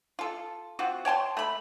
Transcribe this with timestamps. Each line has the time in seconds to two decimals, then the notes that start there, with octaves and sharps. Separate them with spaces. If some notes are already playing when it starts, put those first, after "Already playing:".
0.19 F4 A4
0.79 C4 F4 F#4
1.05 C#5 G5 A5 C6
1.37 A3 B5